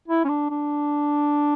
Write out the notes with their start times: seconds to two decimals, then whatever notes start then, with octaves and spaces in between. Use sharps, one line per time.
0.08 E4
0.25 C#4
0.29 D4
0.50 D4